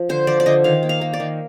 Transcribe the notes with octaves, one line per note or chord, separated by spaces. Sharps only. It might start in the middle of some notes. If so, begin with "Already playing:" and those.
Already playing: F3
D3 C5
F3 D5
D5
D3 D#5
D#3 F5
A#3
F5
A#3
D5
D#3